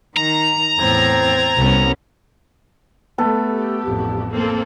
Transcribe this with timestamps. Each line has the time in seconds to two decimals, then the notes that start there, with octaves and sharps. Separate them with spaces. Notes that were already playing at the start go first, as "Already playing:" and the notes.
0.16 D#3 A#5
0.78 E2 A2 C4 G#6 A6
1.58 C2 B3 C#4
3.18 A3 B3 A4
3.52 G4
3.86 A1 F2
4.33 A#3 C4 A4